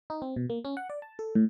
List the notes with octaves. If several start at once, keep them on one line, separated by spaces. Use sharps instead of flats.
D#4
C4
B2
A#3
C#4
F#5
D5
A5
A4
A2